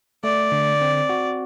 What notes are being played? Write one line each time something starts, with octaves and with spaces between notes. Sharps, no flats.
A3 D5
D3
C4
F#4